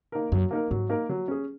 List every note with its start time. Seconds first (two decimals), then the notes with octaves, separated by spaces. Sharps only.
0.12 A#3 D#4 A#4
0.32 F#2 F#3
0.51 A#3 D#4 A#4
0.71 G#2 F#3
0.89 A#3 D#4 A#4
1.09 F#3
1.28 C#4 G#4